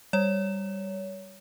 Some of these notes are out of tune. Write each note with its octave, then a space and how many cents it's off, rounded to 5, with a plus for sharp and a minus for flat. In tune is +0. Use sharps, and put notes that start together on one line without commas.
G3 +0 C#5 +25